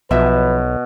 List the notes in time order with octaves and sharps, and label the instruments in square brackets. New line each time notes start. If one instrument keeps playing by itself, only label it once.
[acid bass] B1 [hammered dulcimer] B2 [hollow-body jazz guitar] F3 E5 [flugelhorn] B4